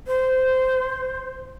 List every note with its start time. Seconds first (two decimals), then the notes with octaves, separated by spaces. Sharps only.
0.07 C5